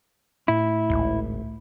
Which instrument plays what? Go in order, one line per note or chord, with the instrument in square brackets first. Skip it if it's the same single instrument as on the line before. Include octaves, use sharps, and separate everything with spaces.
[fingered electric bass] A2 [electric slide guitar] E4
[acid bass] G#1 [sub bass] C#2